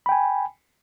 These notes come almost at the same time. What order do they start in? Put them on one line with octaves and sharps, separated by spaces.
B5 G5 G#5